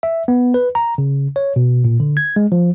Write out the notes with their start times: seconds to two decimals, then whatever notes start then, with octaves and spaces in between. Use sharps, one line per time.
0.03 E5
0.28 B3
0.54 B4
0.75 A#5
0.98 C#3
1.36 C#5
1.56 B2
1.85 A#2
2.00 D3
2.17 G#6
2.36 G#3
2.52 F3